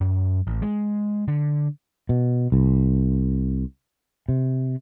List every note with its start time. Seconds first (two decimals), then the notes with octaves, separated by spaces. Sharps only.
0.01 F#2
0.47 A1
0.62 G#3
1.28 D3
2.09 B2
2.52 C2
4.29 C3